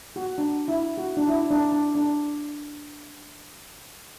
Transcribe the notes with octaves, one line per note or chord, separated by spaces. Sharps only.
F#4
D4
E4
F#4
D4
E4
D4
D4
D4